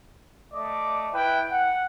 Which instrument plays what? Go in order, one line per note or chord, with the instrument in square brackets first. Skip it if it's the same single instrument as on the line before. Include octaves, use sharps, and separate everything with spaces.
[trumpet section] A3 D5 D#5 D6
E4 B4 G5
F#5